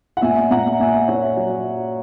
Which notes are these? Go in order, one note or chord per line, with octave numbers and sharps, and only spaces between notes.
F#5
A#2 E5 G#5
A#2 F#5 A#5
A#2 E5 G#5
A#3 C#5 E5
F#3